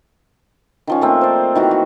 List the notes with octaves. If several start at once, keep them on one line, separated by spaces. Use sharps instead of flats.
D#3 F3 C#4
A3 A#3 C4
C5 D5
D#3 E3 F#4
F#4